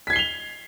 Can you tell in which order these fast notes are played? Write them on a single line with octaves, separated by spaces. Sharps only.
B6 G#6 C7 G7 F7